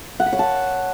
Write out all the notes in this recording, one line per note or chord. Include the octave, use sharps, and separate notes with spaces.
F#5
B5
C#5
A5